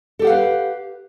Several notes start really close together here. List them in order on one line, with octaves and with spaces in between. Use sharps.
A4 G4 F#5 F5 B4